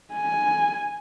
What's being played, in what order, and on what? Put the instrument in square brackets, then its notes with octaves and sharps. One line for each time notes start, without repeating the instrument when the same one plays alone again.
[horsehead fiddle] G#5